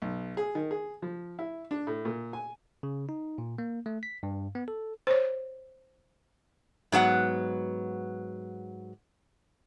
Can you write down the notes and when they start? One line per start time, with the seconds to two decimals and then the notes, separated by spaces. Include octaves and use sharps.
0.02 B1
0.37 G#4
0.55 D#3
0.71 G#4
1.02 F3
1.39 E4
1.71 D4
1.87 A2
2.05 A#2
2.33 G#5
2.83 C#3
3.09 D#4
3.38 A#2
3.58 A#3
3.86 A3
4.03 B6
4.23 G2
4.55 B3
4.68 A4
5.07 C5 C#5
6.92 G#2 F#3 B3 F#5